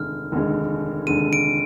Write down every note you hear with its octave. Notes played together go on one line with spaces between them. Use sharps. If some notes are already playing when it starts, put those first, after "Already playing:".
Already playing: F1 D#2 D3 G#3 F6
F1 D#2 D3 G#3
F1 D#2 D3 G#3 D#7
D7